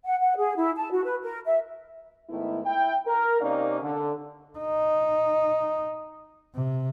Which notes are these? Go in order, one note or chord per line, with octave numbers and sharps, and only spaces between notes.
F#5
F#5
G#4
E4
A5
F#4
B4
A#4
E5
G#2 D#3 A3 B3 E4
E4 G5
A#4
C3 A#3 C#4 D#4 D5 F5
D3
D#4
C3